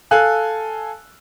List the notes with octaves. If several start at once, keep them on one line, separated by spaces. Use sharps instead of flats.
A4 F5 G#5 F#6